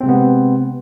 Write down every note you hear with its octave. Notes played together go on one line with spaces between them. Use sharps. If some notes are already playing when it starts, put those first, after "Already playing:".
C3 G#3 B3 C4